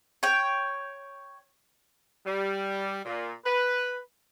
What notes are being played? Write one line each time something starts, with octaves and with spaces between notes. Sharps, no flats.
C#5 G5
G3
A#2
B4